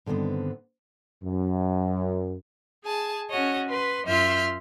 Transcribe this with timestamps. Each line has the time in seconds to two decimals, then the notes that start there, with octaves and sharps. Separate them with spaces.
0.06 G2 D3 D#3 B3 C4
1.22 F#2
2.84 G#4 G#5 A5
3.30 C#4 F#4 C#5 D#5
3.68 B4 C6
4.05 F#2 F4 E5 C6 F6 G6